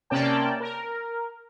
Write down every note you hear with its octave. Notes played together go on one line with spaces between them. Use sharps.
C3 A#3 C#4 D5 G5 A5
A#4